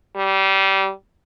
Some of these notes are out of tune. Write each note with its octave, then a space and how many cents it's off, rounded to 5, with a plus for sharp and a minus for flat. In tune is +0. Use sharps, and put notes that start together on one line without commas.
G3 -20